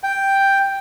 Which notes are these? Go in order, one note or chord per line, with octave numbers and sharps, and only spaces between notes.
G5